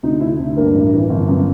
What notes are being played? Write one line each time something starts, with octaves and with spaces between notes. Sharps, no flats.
D2 D#4
D2 E4
D2
G2 A#3 A#4
A1
E3
G1
F#2